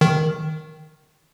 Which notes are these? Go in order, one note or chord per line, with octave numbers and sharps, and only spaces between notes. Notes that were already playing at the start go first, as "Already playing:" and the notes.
D#3